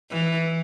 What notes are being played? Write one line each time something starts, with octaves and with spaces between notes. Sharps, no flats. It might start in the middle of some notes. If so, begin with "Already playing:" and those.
E3